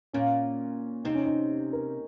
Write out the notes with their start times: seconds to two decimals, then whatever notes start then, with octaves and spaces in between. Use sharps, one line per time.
0.13 A#2 A#3 C#4
1.04 C3 C4 D#4
1.15 C#4
1.24 D#4
1.73 A#4